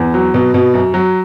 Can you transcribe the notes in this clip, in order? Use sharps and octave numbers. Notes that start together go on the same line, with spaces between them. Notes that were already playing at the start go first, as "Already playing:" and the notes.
Already playing: E2
F#3
B2
B2
F#2
F#3